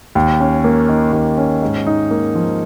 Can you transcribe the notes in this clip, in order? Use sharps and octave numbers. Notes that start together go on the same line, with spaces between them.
D#2
C#4
A#3
D#3
D#2
C#4
G#2
D#4
A#3
F3